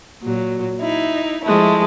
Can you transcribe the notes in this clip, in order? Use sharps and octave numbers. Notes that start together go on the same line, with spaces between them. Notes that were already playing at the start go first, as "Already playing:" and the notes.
A#2 F#3
D#4 E4
F3 G#3 A3 E4